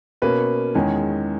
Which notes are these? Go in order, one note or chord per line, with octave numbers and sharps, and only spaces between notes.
B2 A#3 C#4 B4
E2 D#3 G#3 C#4